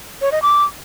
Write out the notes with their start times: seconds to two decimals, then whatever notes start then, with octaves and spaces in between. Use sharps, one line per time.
0.22 C#5
0.32 D#5
0.42 D6